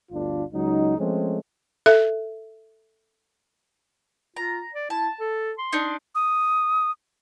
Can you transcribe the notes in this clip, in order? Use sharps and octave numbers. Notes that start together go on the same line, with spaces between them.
G1 D2 D4 F4
C#2 F#3 D#4
F3 G#3 A3 C4 C#4
A4 E5
F4 A#5
D5
E4 A5
A4
C6
D4 D#4
D#6